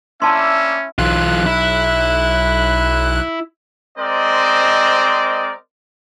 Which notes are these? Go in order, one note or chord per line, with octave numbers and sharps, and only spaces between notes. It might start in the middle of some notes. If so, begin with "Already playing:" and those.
A#3 C#4 D4 E4 E5 A5 C6
B1 E3 F4 F#6
E4
G#3 C4 A#4 C5 D5 D#5